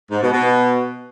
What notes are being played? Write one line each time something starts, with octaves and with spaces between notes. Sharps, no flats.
G#2
B2
B2